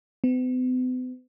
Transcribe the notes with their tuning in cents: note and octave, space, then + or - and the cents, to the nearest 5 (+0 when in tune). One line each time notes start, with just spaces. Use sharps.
B3 +45